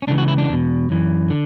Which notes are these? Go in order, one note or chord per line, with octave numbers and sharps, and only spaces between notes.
C#4
C#2 C#3 E3 D4
F#4
E4
D4
E2 B2
F#2 E3
D3